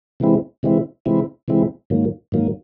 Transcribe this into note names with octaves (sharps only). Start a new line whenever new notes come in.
C3 E3 G#3 C4 E4
C3 E3 G#3 C4 E4
C3 E3 G#3 C4 E4
C3 E3 G#3 C4 E4
G#2 D#3 F#3 A#3
G#2 D#3 F#3 A#3